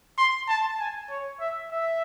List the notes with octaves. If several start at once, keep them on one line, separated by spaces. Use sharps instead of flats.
C6
A5
G#5
C#5
E5
E5